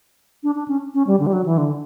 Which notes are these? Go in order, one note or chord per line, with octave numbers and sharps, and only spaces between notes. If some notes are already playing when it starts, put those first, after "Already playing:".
D4
D4
C#4
C#4
G3
D3
G3
F#3
E3
D3